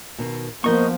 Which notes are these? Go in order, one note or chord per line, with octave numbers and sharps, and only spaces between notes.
B2 D#3
F3 A#3 B3 C#4 A#4 C5 D#5 C#6